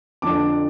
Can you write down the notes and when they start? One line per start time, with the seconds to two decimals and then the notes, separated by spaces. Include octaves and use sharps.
0.22 F2 D3 F3 D4 A5 D6